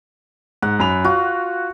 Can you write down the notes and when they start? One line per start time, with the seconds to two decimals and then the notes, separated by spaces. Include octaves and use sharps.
0.63 G#2 F#5
0.79 F#2 B5 F7
1.05 F4 F#4